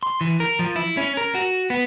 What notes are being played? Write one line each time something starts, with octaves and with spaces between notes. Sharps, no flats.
C6
E3
A#4
F3
E4
C#4
A#4
F#4
B3